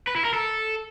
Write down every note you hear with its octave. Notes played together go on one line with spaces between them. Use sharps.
B4
E4
A#4
A4